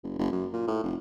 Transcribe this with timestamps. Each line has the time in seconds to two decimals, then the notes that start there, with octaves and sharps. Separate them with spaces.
0.04 F#1
0.19 F#1
0.32 F#2
0.53 A#2
0.68 A2
0.83 F1